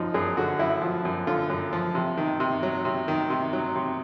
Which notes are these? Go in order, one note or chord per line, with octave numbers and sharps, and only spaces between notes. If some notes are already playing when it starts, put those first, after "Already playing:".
Already playing: F#2 F3 D#4
F#2 G#4
D3 F#4
F#2 E4
F3
F#2
D3 F4
F#2
F3
C3
D#3
C3
F#3
C3
D#3
C3
F#3
C3